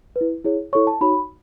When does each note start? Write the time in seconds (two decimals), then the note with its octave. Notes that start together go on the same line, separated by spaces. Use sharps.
0.16 B4
0.21 E4
0.44 E4 G#4 C#5
0.73 E4 A4 C#5 C#6
0.87 A5
1.01 D#4 F#4 C#5 B5